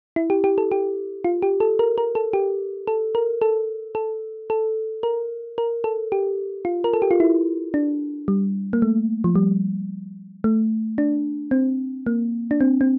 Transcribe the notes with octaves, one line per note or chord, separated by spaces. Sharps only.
E4
G4
G4
A4
G4
F4
G4
A4
A#4
A#4
A4
G4
A4
A#4
A4
A4
A4
A#4
A#4
A4
G4
F4
A#4
A4
G4
F4
E4
D4
G3
A#3
A3
F3
G3
A3
D4
C4
A#3
D4
C4
C4